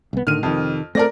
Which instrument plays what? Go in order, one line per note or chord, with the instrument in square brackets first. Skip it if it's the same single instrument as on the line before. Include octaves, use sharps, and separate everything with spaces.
[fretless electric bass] C2 B3
[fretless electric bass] A2 D3 D#3 [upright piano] F6 D#7
[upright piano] F2 [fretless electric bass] C3 D#3
[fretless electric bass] A3 C4 [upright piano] A#4 D5 A#6